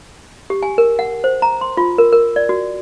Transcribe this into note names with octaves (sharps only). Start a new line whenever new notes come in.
G4
G#5
A#4
F#5
C5
A#5
C6
F4
A#4
A#4
D5
F#4